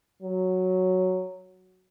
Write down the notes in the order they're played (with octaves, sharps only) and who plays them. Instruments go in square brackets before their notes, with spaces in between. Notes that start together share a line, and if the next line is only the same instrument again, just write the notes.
[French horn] F#3